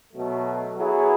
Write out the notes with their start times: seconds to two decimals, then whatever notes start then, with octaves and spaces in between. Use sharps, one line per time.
0.12 B2 F#3 A3
0.76 F#3 B3 E4 G#4